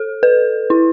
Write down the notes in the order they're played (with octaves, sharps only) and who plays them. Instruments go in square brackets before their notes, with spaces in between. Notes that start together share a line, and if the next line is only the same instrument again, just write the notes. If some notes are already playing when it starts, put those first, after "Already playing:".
Already playing: [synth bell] A4
B4
E4